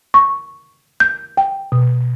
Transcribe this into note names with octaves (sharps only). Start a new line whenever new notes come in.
C#6
G6
G5
B2